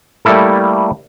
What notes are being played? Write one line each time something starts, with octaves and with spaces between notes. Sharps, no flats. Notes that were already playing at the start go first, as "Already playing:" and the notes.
G3 A3 A#3 E4 A4